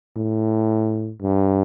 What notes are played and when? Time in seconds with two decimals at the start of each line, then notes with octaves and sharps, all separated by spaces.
0.17 A2
1.21 G2